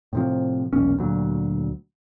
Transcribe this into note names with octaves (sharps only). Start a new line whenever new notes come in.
A2 C3 F3
E1 B1 A#2 C#4
D2 A#2 F#3